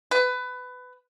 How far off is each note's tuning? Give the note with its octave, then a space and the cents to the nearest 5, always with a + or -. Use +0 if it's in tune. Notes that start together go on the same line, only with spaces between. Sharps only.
B4 +20